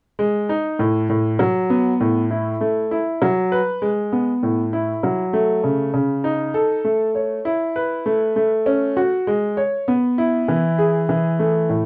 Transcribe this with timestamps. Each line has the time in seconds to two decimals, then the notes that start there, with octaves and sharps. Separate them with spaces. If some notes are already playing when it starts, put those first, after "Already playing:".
0.19 G#3
0.49 D#4
0.79 A2
1.10 A2
1.39 F#3
1.70 B3
2.00 A2
2.31 E4
2.61 A3
2.91 E4
3.22 F#3
3.52 B4
3.82 G#3
4.12 B3
4.43 A2
4.73 E4
5.03 F#3
5.33 A3
5.64 C#3
5.94 C#3
6.24 D#4
6.54 A4
6.85 A3
7.15 C#5
7.45 E4
7.76 B4
8.06 A3
8.36 A3
8.66 C#4
8.97 F#4
9.27 G#3
9.57 C#5
9.88 B3
10.18 E4
10.48 E3
10.79 G#4
11.09 E3
11.39 A3
11.69 A2